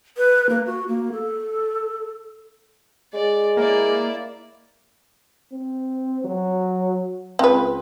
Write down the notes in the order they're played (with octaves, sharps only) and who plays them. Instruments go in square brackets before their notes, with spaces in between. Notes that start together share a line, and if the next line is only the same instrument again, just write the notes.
[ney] B4
A#3
F#4
A#3
A4
[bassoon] G#3 [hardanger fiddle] D5
[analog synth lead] A#3 [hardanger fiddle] E4 D5
[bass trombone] C4
F#3
[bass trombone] C#2 [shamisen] C4 B4